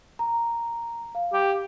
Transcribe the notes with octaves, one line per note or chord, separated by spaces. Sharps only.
A#5
F5
G4